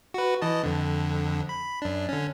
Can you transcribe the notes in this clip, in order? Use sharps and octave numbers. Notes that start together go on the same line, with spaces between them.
F#4 B4
E3 D#5 A5
F2 D3
B5
F#2 D4
D3 C#4